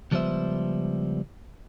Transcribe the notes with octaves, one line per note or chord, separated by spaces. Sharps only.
C#2 F3 G3 B3 C5 E5